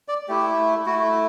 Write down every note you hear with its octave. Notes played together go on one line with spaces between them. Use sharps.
D5
A3 E4 G4
A3 E4 F#4